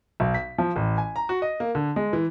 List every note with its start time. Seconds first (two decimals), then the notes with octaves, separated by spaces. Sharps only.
0.20 B1
0.35 B6
0.58 F3
0.76 A1
0.98 G#5
1.16 A#5
1.29 F#4
1.42 D#5
1.60 A#3
1.75 D3
1.96 G#3
2.13 E3